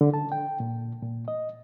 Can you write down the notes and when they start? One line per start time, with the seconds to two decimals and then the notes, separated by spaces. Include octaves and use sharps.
0.01 D3
0.14 A5
0.32 G5
0.60 A#2
1.02 A#2
1.28 D#5